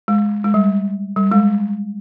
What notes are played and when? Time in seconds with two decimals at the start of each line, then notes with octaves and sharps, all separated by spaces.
0.08 G#3
0.44 G#3
0.54 G3
1.17 G3
1.32 G#3